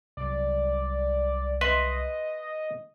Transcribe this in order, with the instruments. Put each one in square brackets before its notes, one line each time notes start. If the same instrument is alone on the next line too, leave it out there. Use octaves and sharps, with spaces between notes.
[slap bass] C2 F#3 [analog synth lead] D5
[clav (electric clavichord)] B4 E5 [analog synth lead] D#5 [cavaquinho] C6